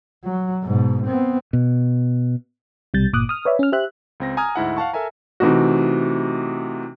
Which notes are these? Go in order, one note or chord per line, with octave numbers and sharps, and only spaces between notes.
F#3
G#2 B2
B3 C4
B2
B1 C3 G3 G6 A6
G1 A#2 D6 D#6 F#6
D#6 F6
B4 C#5 D5 E5
C#4 F6
G4 C5 E5 F#6
C#2 C4 A#6
G#5 A#5 D#6 F6 G#6
D2 G#2 E4 F#5
F5 F#5 A5 C#6
A4 A#4 E5 G#5 A#5
C3 E3 A3 D#4 F#4